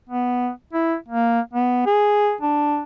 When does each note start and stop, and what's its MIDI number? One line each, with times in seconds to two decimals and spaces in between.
0.09 0.50 59
0.73 0.96 64
1.08 1.40 58
1.53 1.82 59
1.86 2.34 68
2.41 2.83 62